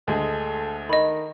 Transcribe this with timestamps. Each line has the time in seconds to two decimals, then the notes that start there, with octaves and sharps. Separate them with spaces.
0.08 D2 G#3 A4
0.89 D#3 D#5 B5